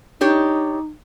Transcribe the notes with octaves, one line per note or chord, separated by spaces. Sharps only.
D4 D#4 G4 C#5